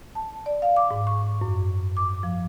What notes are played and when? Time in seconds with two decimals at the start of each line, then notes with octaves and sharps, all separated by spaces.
0.15 A5
0.46 D5
0.62 F5
0.77 D6
0.91 G#2
1.07 C#6
1.41 F#2
1.97 D6
2.23 F3